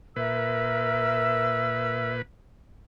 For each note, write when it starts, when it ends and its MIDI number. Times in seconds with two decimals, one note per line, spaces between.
0.16 2.22 46
0.16 2.13 70
0.16 2.22 71
0.16 2.13 76
0.16 2.13 88